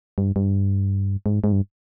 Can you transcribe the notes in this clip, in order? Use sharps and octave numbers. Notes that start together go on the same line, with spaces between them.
G2
G2
G#2
G#2
G2